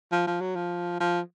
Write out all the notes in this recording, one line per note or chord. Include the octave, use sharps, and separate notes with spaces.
F3
F3
F#3
F3
F3